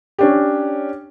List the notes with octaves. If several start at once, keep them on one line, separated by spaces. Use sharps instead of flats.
C#4 D4 G4